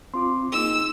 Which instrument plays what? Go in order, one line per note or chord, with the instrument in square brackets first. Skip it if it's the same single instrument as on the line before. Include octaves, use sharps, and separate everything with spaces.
[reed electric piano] C4 F4 D6 [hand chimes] C6
[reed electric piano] A#3 D#4 G#4 [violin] E6